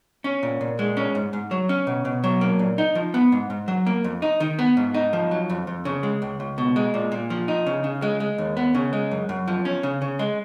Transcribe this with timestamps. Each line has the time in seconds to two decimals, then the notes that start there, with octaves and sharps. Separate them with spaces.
0.24 C#4
0.43 A#2
0.61 A#2
0.79 G#3
0.97 C#4
1.15 G#2
1.33 G#2
1.51 F#3
1.69 C#4
1.87 B2
2.05 B2
2.24 F#3
2.41 A#3
2.59 A#2
2.78 D#4
2.95 F3
3.14 B3
3.32 G#2
3.50 G#2
3.68 F#3
3.87 A#3
4.04 F2
4.22 D#4
4.40 D#3
4.59 B3
4.77 G#2
4.94 D#4
5.13 F3
5.31 F#3
5.50 F2
5.67 F2
5.85 C#3
6.03 G#3
6.22 C#2
6.40 C#2
6.58 B2
6.76 G#3
6.94 A#2
7.12 A#2
7.30 F3
7.48 D#4
7.66 C#3
7.84 C#3
8.02 G#3
8.20 G#3
8.38 D#2
8.57 B3
8.75 C#3
8.93 G#3
9.11 F#2
9.29 F#2
9.48 F3
9.65 C#4
9.83 C#3
10.02 C#3
10.19 G#3